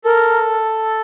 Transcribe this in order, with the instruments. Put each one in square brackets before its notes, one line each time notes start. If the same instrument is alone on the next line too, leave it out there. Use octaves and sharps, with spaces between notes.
[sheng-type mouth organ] A4 [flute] A#4